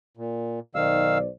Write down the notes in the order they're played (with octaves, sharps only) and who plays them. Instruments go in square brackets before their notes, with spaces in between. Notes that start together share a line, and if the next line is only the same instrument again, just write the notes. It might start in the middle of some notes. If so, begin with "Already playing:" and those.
[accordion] A#2
[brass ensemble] B1 C5 D5 [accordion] D#3 F5 E6